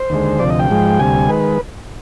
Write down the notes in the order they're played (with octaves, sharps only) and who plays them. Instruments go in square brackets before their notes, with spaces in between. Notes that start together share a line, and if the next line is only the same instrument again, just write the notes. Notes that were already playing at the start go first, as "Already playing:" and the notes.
Already playing: [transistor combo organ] C5
D#2 D3 G#3
D2 C3 F3 D5
D#5
G5
G#2 F3 G#3
D2 C3 G3 G#5
D#3 G#3 B4